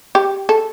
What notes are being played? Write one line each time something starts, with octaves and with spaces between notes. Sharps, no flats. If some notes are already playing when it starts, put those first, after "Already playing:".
G4
A4